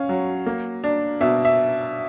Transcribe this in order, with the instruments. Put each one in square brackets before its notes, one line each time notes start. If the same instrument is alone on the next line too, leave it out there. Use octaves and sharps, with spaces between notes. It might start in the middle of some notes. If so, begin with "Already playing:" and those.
Already playing: [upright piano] C#4 [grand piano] F5
[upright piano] F#3
A#3
D4
[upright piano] B2 [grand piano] E5
[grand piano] E5